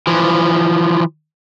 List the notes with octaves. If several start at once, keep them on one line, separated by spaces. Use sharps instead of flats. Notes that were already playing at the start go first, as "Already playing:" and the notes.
E3 F3